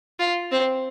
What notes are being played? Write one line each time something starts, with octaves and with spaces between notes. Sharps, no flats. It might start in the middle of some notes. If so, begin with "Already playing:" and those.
F4
C4